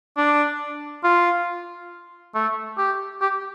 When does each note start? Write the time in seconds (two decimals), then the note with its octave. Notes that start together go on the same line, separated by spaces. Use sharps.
0.17 D4
1.04 F4
2.35 A3
2.78 G4
3.21 G4